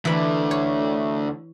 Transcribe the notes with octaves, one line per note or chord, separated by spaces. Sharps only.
D2 D3 E3 B5
C#5